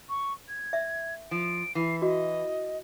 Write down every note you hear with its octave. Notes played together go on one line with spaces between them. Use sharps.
C#6
G#6
E5
F3 D7
E3 C7
F#4 D#5